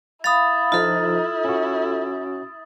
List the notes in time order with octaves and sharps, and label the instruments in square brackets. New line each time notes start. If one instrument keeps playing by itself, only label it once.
[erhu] E4 [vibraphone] F5 B5 [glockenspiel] D#6 A6
[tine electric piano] F3 D#4 [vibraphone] F4 A4
[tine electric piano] C#4 F#4